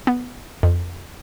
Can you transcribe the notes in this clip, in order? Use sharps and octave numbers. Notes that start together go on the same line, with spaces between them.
B3
F2